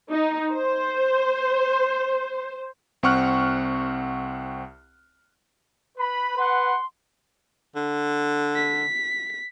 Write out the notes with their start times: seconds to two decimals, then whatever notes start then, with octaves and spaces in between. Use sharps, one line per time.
0.10 D#4
0.52 C5
3.03 C2 C4 F#5 C#6 F6 F#6
5.97 B4 B5
6.37 B4 F#5 C6
7.76 D3
8.56 B6